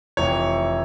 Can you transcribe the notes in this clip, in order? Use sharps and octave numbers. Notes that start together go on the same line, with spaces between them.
F1 F2 E3 C#5